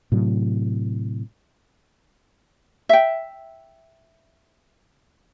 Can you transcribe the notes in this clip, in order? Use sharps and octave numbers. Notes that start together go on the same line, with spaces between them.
A2 C3 F#3
E5 G5